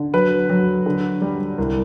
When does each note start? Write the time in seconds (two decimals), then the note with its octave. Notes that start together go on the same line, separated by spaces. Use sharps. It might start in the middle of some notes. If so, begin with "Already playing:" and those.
Already playing: D3
0.14 F#3 B4
0.50 F#3
0.86 D3
1.22 G3
1.58 C2